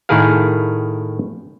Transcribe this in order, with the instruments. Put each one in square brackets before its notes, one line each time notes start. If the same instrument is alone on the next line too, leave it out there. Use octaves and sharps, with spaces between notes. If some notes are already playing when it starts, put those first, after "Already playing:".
[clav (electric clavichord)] A2 D#3 E4 G#4 A#4 F5